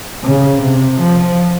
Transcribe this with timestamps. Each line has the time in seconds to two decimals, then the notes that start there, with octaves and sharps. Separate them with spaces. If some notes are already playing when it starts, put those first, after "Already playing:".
0.24 C#3
0.61 C3
1.00 F3